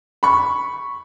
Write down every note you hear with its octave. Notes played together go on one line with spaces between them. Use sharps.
B5 C#6